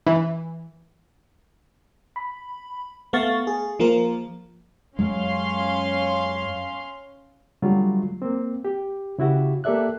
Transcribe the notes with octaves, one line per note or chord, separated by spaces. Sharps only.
E3
B5
A3 B3 F5 C#6 A6
G#4
F3 A#3 F4 A#4
F#2 F#3 G#3 C#4 F5 C6
D3 F#3 G3 A3 F4
A#3 C4
G4
C#3 E4 F#4 G4
A#3 G4 A4 D5 E5 F#6